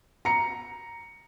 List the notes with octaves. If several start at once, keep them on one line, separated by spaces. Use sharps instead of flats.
A#5 C#7